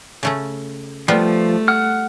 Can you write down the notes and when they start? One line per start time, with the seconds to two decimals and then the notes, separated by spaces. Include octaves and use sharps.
0.23 C#3 A3 C#4
1.08 F3 G3 A3 B3 F4
1.68 F#5 F6